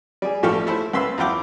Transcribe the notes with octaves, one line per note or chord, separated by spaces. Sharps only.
G3 G#4
A1 F3 G4 A4 F5 C#6
A3 E4 A4 C5
C#2 A#3 B4 B5 C6 E6
E2 F#3 F4 G5 D6